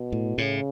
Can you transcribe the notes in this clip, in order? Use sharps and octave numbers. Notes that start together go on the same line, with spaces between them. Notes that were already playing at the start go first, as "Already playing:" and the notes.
Already playing: B2
A2
A2 C#3